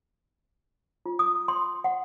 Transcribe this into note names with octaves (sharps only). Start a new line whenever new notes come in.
F4
D#6
C6
F#5